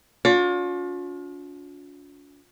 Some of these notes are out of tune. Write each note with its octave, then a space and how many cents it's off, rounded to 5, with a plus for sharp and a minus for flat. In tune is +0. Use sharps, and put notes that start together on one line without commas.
D4 -45 F4 +40